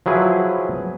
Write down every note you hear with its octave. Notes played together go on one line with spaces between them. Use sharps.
F3 F#3 E4 G#4 B4